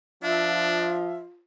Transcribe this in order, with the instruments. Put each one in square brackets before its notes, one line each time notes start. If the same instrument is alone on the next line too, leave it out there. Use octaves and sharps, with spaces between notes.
[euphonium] F3 [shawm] D4 [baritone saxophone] F4 [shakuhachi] E5